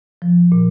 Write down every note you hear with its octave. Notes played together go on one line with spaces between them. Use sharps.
F3
A#2